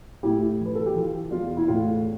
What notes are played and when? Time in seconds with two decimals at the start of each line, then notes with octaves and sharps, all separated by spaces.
0.23 A2 E4 G4
0.60 E3
0.66 B4
0.75 A4
0.86 G4
0.96 E3 F4
1.31 E2 F4
1.57 E4
1.67 A2 F4